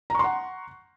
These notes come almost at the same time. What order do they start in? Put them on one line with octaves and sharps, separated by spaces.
A#5 C#6 C6 F#5